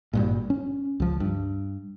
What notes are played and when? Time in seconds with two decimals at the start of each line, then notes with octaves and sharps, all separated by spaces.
0.13 G#1 G2 A#2
0.50 C#4
1.00 C#2 F3
1.20 G2